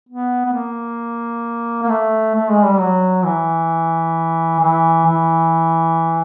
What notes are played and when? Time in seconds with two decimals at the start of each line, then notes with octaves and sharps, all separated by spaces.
0.09 B3
0.45 B3
0.53 A#3
1.83 A#3
1.89 A3
2.35 A3
2.49 G#3
2.65 G3
2.80 F#3
3.25 E3
4.60 E3
5.06 E3